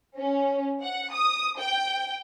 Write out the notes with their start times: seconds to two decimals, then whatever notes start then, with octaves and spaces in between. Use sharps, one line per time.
0.18 C#4
0.82 F#5
1.12 D#6
1.58 G5